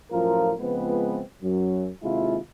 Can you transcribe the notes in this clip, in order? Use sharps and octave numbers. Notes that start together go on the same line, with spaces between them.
F#2 A2 F3 F4 A#4
C#2 F3 G#3 B3 C4 B4
F#2 F#3
D#2 C3 G#3 E4 F4